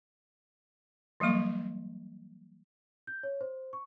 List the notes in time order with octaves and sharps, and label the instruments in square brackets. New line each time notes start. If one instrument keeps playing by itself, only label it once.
[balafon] E3 F#3 G3 A#3 C#6
[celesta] G6
C#5
C5
C#6